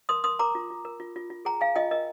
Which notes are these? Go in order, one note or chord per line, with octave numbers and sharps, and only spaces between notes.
A#4 C6 D#6
A#4 C6 D#6
A#4 A#5 D6
F4
F4
A#4
F4
F4
F4
G#4 G5 A#5
G#4 F5 G#5
F4 D#5 G5
A#4 D#5